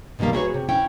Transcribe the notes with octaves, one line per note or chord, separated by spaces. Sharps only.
B2 D3 D#3 G3 A#3
E4 F#4 G#4 A4 B4 C#5
C3
C#4 E4 G5